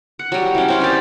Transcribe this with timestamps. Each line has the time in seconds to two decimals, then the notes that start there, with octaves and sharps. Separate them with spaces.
0.19 F#5
0.32 F#3 G3
0.55 E3 C#4
0.68 C4 C#4 F5
0.80 G3 D#4 G4 D5